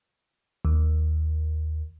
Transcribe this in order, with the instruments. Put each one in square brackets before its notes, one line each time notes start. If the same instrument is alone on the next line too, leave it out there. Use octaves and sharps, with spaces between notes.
[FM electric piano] D#2